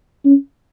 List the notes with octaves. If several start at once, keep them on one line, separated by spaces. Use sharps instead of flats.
C#4